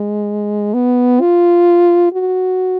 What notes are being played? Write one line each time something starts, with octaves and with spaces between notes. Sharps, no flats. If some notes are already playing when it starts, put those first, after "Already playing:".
Already playing: G#3
B3
F4
F#4